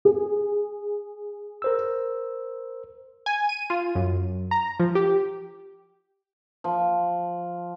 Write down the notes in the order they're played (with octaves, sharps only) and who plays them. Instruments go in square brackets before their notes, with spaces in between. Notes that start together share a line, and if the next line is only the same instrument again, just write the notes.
[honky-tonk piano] G#4
[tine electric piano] A#4 C5 E6
[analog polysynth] G#5
D#7
F4
F#2
A#5
F3
G4
[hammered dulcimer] F3